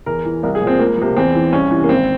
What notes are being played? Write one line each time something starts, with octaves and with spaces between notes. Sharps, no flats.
E2 A#4
E3
C2 A#4
G#4
A#2 F3
C4
C#2 A#3
C3 F3 A#3
E2 C4
E3
C2 C#4
C3 E3
A#3
G#1 C4